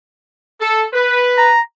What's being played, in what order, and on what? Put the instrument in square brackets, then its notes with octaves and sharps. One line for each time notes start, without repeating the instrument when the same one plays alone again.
[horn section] A4
B4
[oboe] A#5